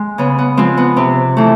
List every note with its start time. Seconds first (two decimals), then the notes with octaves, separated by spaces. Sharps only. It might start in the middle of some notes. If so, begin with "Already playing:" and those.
Already playing: G#3
0.18 C#3 B3
0.38 B3
0.57 F3 G#3 C4
0.77 B3
0.96 C3 C4
1.37 E3 A3